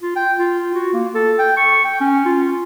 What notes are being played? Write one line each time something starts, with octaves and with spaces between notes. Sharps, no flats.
F4
G5
F4
F#4
A#3
A4
G5
C#6
G5
C#4
F4